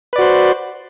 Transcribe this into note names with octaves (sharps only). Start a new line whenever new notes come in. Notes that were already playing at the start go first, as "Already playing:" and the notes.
F#4 B4 C5 D5